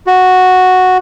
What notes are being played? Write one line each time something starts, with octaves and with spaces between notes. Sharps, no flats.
F#4